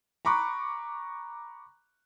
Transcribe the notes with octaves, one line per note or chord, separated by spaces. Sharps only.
A#5 B5 C#6 D6 F#6